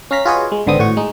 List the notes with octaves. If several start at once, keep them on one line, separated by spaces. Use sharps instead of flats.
C#4 F5 A#5 B6
F4 F#4 G#4 B4 C#5 D#5
G#3
G#1 D3 B3 C4 D#6
G#1 A2 F#4 C#6
G#3 D#4